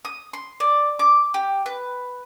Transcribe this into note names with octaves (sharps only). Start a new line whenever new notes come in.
D#6
C6
D5
D6
G4
B4